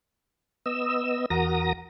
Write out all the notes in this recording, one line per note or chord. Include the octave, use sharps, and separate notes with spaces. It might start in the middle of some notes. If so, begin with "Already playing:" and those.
B3 D#5 E6
E2 F#4 A#4 A#5 D#6 A#6